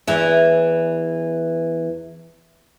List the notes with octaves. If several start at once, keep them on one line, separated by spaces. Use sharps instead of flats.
E2 E3